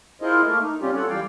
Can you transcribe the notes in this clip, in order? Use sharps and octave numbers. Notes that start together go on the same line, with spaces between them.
E4 F4 G#4 A#4 C5 D#5
A3 A#3 A#4
D#4
C3 G3 C4 C#4 F4 G4
F4 A4 C#5 F#5
E2 E3 G3 D5 F5 G5